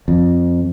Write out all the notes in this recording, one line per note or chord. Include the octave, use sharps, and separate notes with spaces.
F2